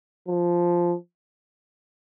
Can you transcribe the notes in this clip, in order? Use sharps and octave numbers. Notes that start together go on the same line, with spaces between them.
F3